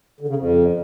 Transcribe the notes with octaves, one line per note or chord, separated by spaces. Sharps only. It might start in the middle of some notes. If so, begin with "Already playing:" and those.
D3
C#3
F2